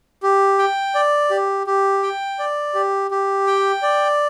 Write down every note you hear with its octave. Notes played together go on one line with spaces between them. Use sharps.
G4
G5
D5
G4
G4
G5
D5
G4
G4
G5
D5